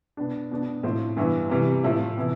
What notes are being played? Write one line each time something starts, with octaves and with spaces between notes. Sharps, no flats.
B2 B3 D4
B2 B3 D4
A2 F3 C4
G2 E3 B3 E4
C3 E3 G3
A2 F3 A3 E4
C3 E3 B3 E4